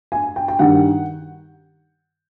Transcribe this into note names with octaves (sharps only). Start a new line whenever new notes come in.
G#5
G5
G5
G2 D#3 G3 F#5